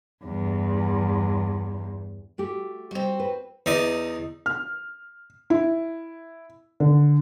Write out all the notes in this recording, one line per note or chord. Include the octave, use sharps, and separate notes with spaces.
E2 G2
A3 F#4 G4
G3 C4 F#4
B4
E2 D#4 D5 D#5
F6
E4
D3